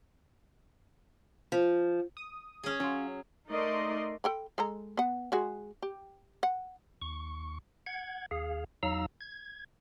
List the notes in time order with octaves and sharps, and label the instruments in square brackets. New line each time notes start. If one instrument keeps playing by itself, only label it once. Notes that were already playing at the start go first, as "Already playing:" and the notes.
[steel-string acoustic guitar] F3
[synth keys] D#6
[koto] C#4 G#4
[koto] F#3 [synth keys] C#4 F4
[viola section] A3 D#4 A#4 D5 D#5 C6
[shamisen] A4 G5 B5
G#3 A4 A#5
B3 F#5
G#3 F#4 G#4
G4
F#5
[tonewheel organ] D#2 C#6
F#5 G#6
D#2 G#4 F5
E2 F#3 D#4 F5 A#5 E6
G#6